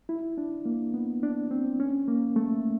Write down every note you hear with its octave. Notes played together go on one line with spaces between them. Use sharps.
E4
D4
A#3
B3
D4
C4
C#4
A#3
A3